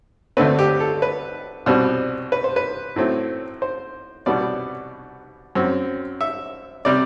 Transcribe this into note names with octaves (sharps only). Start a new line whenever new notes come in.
D2 D3 A3 C4 B4
G4
A4
B4
C2 B2 G3 C4
B4
C5
B4
A2 F#3 A3 C4
C5
C2 B2 G3 B3 D5
F#2 F#3 C4
E5
C3 G3 D5